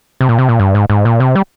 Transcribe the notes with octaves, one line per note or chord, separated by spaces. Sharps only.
C3
A#2
C3
A#2
G2
G#2
G#2
A#2
C3
G3